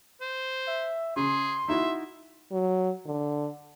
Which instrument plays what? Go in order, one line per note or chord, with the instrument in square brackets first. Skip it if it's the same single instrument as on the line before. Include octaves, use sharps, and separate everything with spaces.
[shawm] C5
[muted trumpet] E5
[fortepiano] C#3 [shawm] G#4 [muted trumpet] C6
[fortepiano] D#4 E4 F#4 [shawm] E5
[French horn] F#3
D3